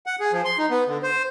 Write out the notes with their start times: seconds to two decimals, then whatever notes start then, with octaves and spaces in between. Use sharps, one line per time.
0.06 F#5
0.20 G#4
0.32 F3
0.45 C6
0.58 D#4
0.70 B3
0.88 D3
1.03 C5